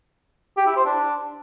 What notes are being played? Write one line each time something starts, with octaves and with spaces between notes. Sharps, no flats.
G4
E4
C5
D4